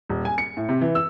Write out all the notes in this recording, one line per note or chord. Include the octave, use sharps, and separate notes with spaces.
D#1
G#5
C#7
A2
C3
E3
E6